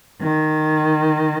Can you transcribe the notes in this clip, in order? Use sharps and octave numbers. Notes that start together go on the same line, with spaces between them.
D#3